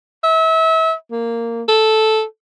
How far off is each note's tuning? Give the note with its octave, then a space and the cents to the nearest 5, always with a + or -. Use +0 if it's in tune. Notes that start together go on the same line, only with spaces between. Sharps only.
E5 -30
A#3 -10
A4 -5